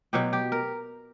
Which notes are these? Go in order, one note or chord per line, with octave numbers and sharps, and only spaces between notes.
B2 F#3 G4
G4
A#4